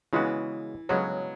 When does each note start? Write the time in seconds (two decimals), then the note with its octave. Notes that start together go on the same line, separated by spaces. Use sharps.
0.13 C#3 E3 G#3 B3 F#4
0.89 C#3 F#3 G#3 B3 F#4